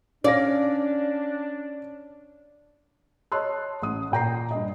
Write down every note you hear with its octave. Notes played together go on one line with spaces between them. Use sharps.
C#4 D4 D5 F5 A#6
C#5 D#5 A5 C6 E6 F#6
A1 D#6
A#2 G5 A#5 C7
G2 D#5